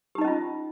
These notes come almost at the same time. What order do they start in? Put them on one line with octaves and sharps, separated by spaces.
G4 D#4 D#5 C#4 F4